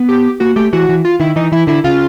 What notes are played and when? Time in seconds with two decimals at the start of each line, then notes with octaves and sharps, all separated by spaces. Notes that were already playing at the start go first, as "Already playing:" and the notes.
Already playing: B3
0.09 G4
0.40 A#3 F#4
0.56 A3 G4
0.73 E3 F#4
0.89 E3
1.05 F4
1.20 D#3 E4
1.36 E3 D#4
1.52 E3 E4
1.67 D3 E4
1.84 C#3 F4